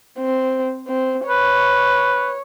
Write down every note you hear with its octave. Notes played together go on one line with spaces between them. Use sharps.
C4
C4
B4 C#5